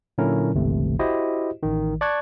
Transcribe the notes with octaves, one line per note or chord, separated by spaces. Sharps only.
A#2 D3 F#3 C#4 E4 A#4
G1 C#2 C3 E3 A3
E4 F#4 G4 C5 D#5
A1 D#3
D5 A5 C#6 F#6 G#6